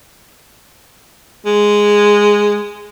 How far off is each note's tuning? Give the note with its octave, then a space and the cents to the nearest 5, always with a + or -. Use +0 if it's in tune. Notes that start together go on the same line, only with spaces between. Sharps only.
G#3 -5